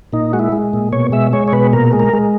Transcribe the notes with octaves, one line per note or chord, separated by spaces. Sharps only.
A#2 D#4
G#3 F#4
E4
G#3
A#2
B2 C#5
G#3 E5
G#3 C#5
C#5
B2 B4
A#2 A#4
G#3
A#4
G#3